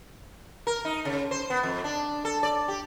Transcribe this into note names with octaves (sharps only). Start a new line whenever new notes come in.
A#4
D#4
C#3
C5
B3
F2
D4
A4
D5
G4